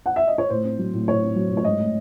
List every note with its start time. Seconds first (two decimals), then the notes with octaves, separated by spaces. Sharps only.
0.06 F#5
0.16 E5
0.27 D#5
0.38 C#5
0.50 A2 C5
0.64 C4
0.79 F#3
0.93 A2
1.08 A2 C#5
1.22 C4
1.36 F#3
1.50 A2
1.57 C#5
1.64 G#2 D#5
1.80 A3